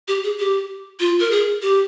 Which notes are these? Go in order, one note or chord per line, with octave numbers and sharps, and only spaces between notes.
G4
G#4
G4
F4
A#4
G#4
G4